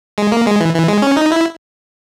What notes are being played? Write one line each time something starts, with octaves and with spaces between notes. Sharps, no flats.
G#3
A#3
G#3
E3
E3
G#3
C#4
D#4
E4